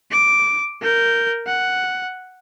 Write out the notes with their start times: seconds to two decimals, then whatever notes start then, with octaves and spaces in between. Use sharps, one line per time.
0.11 D6
0.81 A#4 G6
1.47 F#5